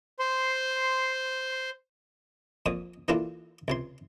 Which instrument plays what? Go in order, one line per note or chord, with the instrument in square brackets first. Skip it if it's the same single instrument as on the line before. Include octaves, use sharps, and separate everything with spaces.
[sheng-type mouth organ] C5 C6
[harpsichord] F2 A#2 D#6
E3 A#3 D4 E4 F4 A4
C#2 C3 C6